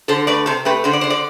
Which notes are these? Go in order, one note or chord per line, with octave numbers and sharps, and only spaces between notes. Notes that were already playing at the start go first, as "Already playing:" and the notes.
D3 A4 C5
A3 B4 D5
C3 A4 C5
A3 G4 B4
D3 C5
D5
D3 C5
D5